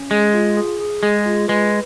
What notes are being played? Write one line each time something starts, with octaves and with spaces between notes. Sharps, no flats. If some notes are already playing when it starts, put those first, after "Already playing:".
Already playing: C#4
G#3 G#4
F4
G#4
G#4
G#3 G#4
F4
G#3 B4